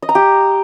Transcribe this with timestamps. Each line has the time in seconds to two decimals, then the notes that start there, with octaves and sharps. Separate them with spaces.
0.02 D#5
0.09 A#5
0.15 G4